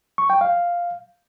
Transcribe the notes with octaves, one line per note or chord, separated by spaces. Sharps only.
C#6
G5
F5